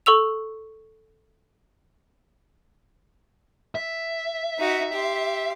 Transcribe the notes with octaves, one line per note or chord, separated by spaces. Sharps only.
A4 C#6 E6 F7
E5
D#4 F#4
G4 C6